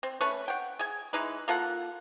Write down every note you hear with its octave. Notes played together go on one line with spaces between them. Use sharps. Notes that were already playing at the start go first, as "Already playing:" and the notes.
C4
A3 C#4 B4 C#6
F#5 G5
G#4 G#5
E3 G#3 D#4 B4
A#3 F4 A4 F#5